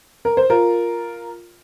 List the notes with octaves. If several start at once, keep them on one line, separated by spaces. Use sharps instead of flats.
A#4
C5
F4 A#4